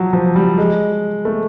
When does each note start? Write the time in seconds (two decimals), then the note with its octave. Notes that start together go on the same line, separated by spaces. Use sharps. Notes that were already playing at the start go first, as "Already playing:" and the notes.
Already playing: F3 F#3
0.13 F3
0.36 G3
0.58 G#3
1.25 A3